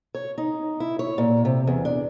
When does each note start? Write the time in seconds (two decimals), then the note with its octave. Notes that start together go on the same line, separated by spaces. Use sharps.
0.15 C#5
0.38 D#4
0.80 E4
0.99 C#5
1.18 A#2
1.45 C3
1.67 E2
1.85 D4